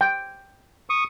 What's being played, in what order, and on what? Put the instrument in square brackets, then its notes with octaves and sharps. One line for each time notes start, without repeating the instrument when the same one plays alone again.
[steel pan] G5
[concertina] C#6 D#6